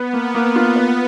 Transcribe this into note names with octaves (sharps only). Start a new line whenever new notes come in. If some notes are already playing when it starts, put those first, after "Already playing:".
Already playing: B3 B4
A#3
A#3
F4
B4